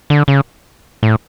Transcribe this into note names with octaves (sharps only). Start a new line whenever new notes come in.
D3
C#3
A2